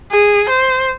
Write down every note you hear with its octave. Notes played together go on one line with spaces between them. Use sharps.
G#4
C5